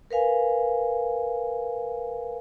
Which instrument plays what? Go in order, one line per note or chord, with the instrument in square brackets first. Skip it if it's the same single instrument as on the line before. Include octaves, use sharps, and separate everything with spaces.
[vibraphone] A#4 B4 F5 G#5